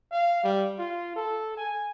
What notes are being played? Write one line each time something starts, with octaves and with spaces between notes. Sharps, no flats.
F5
G3
F4
A4
G#5